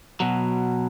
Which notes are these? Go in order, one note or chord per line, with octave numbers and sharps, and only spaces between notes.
B2 F#3